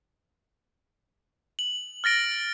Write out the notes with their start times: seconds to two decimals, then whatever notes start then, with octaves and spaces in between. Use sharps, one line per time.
1.59 F#7
2.04 F6 A6 A#6 D7